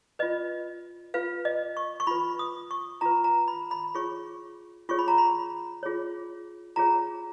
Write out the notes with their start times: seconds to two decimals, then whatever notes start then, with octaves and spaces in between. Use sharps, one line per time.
0.19 F4 B4 D#5
1.14 F4 B4 F5
1.45 D#5
1.77 C#6
2.00 C#6
2.07 F4 B4 B5
2.39 D#6
2.71 C#6
3.01 F4 B4 A#5
3.24 A#5
3.48 B5
3.71 B5
3.95 F4 G#4 C#5 C#6
4.89 F4 G#4 C#5 C#6
4.99 B5
5.08 A#5
5.18 B5
5.83 F4 G#4 C#5
6.76 F4 G#4 C#5 A#5